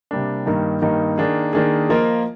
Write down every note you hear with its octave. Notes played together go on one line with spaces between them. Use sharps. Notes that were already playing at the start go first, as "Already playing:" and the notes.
C3 G3 A#3 D4
G2 D#3 A#3 D#4
G2 D#3 A#3 D#4
D#3 A#3 D4 G#4
D#3 A#3 D4 G#4
F3 A#3 F4 A#4 D#5